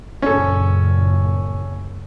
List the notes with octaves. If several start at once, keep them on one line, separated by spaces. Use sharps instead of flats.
F#1 F#2 A#2 C#4 A4